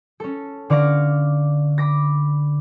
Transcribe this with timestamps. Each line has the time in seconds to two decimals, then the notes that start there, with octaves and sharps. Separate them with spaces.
0.20 C#4 A4
0.70 D3 D5 F5 C#6 D6 A#6
1.78 B5 D6 A#6